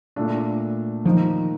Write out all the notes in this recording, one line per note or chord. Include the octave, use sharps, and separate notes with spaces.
A#2 A3 D4
D#3 F3 A#3 D#4